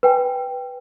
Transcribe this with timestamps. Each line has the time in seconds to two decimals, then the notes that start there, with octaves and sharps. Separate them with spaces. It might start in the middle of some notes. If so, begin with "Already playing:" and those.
0.03 B4 G5 G#5